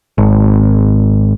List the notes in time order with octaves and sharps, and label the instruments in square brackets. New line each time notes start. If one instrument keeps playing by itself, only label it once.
[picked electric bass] G#1